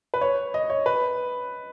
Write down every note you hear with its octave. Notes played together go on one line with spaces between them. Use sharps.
B4
C#5
D#5
C#5
B4